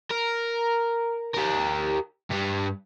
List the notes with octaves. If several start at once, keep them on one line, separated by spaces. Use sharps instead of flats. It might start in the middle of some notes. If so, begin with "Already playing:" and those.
A#4
G4 A#4
G2 G3